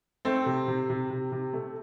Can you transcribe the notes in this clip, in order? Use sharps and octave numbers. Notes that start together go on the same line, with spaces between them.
A3 C4
C3
C3
C3
C3
C3
A3